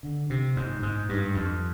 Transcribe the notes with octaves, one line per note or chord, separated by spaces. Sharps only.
D3
C3
G#2
G#2
G2
F2